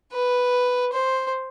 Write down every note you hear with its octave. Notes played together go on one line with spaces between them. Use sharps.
B4
C5